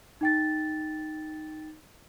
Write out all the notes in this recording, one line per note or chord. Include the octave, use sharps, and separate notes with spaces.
D#4 G5 A6